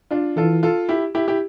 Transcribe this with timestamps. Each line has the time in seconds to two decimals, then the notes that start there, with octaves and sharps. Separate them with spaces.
0.11 D4 F4
0.36 E3 F4 A4
0.63 F4 A4
0.89 E4 G4
1.15 E4 G4
1.28 E4 G4